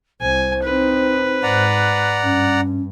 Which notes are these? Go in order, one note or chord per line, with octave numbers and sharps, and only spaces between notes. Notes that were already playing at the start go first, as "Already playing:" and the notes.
C2 C5 G#5
C4 D#4 B4
G#2 D5 F#5 A#5
G2 C#4